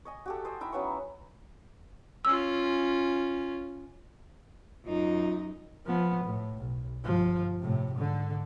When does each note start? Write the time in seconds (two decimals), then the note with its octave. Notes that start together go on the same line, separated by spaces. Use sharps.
0.05 C#5 D#5 G#5
0.26 F#4 G4 A4
0.45 C5 D#5 G#5
0.61 D#4 E4 E5 G5
0.72 F#3 B3 C#4 C#6
2.25 C#4 F4 E6
4.85 F#2 D#4 F4
5.86 F3 B3
6.24 A2
6.58 B1
7.04 G1 F3
7.60 A2 C3
7.94 G#2 D3